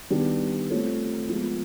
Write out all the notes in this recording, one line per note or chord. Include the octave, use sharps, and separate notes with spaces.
D#3 G3 B3 D4 G4
A3 C4 F4 A4 C#5
F3 G#3 B3